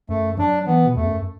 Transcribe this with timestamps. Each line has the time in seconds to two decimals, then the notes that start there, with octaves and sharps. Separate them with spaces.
0.09 F#2 A3
0.38 F#3 D4
0.66 E3 B3
0.86 B2
0.96 E2 A3
1.05 F#2